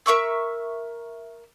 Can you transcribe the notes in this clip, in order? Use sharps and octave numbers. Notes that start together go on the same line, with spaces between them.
A#4 E5 C#6 E6